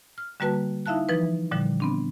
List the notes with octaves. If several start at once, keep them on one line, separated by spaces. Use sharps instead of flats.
F6
D3 G3 A#3 F#4 B4 A5
D#4 E4 E5 F5 A5 F#6
E3 F3 D#4 B4
A#2 D3 F3 G3
B3 C4 D4